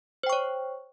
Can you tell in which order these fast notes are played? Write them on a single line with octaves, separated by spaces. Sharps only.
C5 G5 C#6 C#5